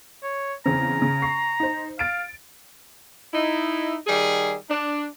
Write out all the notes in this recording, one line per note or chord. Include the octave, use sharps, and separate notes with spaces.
C#5
E2 C#3 C4 A#5
C#3
C#6 C7
D#4 C5
F5 A6 D7
D#4 E4
D#3 G3 G#4
D4